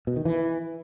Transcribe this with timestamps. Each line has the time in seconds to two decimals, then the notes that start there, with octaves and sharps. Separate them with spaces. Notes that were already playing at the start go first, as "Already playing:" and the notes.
0.07 B2
0.16 D#3
0.25 E3